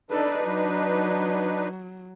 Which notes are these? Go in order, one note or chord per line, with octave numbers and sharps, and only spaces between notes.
D4 D#4 A4 B4 D5
F#3